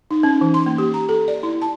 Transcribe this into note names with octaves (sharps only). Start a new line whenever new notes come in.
D#4
C#4
E3
C6
A#3
G4
A#5
A4
D5
E4
A5